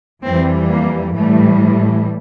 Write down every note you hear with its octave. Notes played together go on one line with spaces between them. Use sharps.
F2 E3 G3 C4
A#3
A2 E3 G3 A3